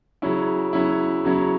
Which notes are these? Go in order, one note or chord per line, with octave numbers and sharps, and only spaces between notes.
C#3 F#3 C#4 E4
C#3 F#3 C#4 E4
C#3 F#3 C#4 E4